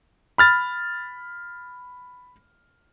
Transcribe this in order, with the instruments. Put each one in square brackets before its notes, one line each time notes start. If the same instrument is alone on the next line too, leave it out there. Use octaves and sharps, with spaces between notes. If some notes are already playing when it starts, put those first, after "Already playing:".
[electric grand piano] B5 F6 A6